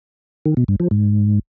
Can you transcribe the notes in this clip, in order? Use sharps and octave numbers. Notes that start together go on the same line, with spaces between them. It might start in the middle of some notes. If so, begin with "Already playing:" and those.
D#3
B2
G2
F3
G#2